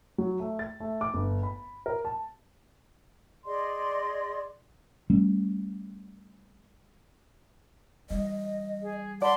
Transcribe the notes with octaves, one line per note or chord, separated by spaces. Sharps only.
F#3
A3
A6
A3
D6
G1
B5
A#4
A5
G#4 D5 D#5 C6
G3 A3 C#4
E3 G3 D#5
G#4
D5 F#5 A5 B5 C6